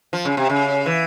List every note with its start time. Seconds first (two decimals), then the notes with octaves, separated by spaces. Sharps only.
0.13 F3
0.25 C#3
0.37 C3
0.50 C#3
0.86 E3